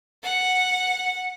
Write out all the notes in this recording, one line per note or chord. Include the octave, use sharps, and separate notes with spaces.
F#5